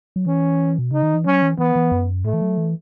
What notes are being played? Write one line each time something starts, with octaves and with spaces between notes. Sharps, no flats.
F#3
E3 C#4
B2
C#3 D#4
D#3
E3
F#3 C#4
E3
E3 B3
E3
F#2
A2 A3
E3
F#3
E3